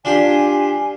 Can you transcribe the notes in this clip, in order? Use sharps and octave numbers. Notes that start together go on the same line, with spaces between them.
D4 F4 G4 G#5